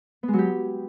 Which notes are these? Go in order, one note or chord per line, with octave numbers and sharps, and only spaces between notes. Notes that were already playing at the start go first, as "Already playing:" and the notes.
B3
G#3
F#3
G4